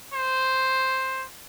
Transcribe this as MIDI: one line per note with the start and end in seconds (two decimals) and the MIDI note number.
0.13 1.25 72